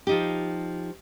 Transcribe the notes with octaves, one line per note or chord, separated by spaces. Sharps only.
F3 D#4 G4